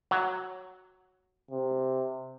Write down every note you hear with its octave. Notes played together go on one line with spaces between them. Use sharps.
F#3
C3